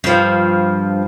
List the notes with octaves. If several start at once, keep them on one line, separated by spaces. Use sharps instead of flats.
G2 F3